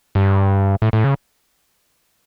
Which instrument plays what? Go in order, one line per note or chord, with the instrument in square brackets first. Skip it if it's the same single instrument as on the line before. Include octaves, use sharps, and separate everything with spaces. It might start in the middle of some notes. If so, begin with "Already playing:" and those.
[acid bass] G2
A2
A2
C#3